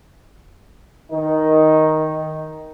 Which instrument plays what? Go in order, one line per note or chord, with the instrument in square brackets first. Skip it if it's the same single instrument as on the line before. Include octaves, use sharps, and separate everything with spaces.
[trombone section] D#3 D#4